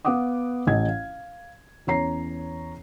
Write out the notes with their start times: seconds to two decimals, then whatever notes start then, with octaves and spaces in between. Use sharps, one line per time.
0.05 B3 F5 F#5 D6 D#6
0.67 A1 D#5 G#6
0.88 F5
1.87 E2 C#4 C#5 A#5 C7